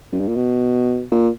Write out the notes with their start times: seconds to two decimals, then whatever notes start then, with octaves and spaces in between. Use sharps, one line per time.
0.12 F#2
0.20 G2
0.28 A#2
0.36 B2
1.12 A#2